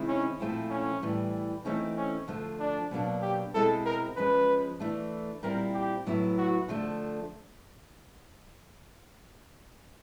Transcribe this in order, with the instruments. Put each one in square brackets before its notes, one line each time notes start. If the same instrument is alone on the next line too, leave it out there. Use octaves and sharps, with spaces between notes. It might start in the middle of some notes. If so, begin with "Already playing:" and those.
Already playing: [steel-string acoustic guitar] C3 D#3 G#3 C4 E4
[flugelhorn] C#4
[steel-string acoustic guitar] A#2 F3 A3 C4 E4
[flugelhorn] C#4
[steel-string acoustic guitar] A2 E3 G3
[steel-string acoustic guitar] E3 A3 C4 D#4 [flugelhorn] C#4
[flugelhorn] C#4
[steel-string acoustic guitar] D3 F3 A3
[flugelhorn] D4
[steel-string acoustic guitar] B2 F#3 A#3 D4
[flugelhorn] G4
[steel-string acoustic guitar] B2 G#3 C4 E4 [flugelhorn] A4
[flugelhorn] A#4
[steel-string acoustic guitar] F3 G#3 C#4 [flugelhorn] B4
[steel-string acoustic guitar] E3 A3 D4
[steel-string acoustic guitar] A#2 G3 C4 E4 [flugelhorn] A#4
[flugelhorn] G4
[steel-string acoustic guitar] A2 F#3 B3 E4
[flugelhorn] F#4
[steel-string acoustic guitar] D3 F3 A3 D4